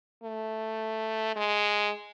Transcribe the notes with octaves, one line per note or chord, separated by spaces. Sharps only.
A3
G#3